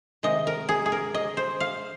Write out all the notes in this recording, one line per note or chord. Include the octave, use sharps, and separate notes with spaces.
C3 D#3 G#3 D#5
A#4
G#4
G#4
A#4
D#5
C5
F5